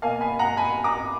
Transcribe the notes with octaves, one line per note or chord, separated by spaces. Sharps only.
B2 A#3 F5 G#5
G#5 B5
F#5 A#5
G#5 B5
A#5 D6